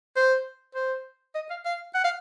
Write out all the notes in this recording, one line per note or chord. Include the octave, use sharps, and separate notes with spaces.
C5
C5
D#5
F5
F5
F#5
F5